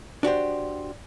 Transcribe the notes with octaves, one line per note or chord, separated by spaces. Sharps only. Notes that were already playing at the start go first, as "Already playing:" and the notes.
D4 F#4 G4 C5